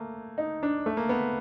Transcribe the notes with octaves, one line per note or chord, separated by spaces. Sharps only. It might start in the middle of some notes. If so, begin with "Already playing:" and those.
Already playing: A3 A#3
D#4
D4
A3
A#3
B3